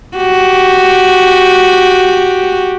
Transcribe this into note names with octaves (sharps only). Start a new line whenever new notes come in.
F#4 G4